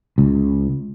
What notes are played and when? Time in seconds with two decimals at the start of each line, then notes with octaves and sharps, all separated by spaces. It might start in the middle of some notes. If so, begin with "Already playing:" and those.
0.18 C#2